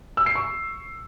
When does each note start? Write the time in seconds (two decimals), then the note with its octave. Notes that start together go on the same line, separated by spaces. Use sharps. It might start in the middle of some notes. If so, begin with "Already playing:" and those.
0.17 E6
0.26 C7
0.35 C#6